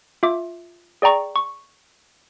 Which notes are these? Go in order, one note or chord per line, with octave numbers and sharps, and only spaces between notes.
F4 E5 D6
G#4 D5 G5 A#5 C#6
C#6